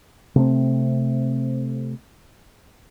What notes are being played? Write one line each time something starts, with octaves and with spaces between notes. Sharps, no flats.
C3 A3 C4